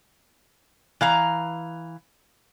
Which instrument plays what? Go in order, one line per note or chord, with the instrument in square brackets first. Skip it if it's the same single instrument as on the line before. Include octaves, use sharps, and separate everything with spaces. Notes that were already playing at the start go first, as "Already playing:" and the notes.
[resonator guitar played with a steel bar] E3 F5 A#5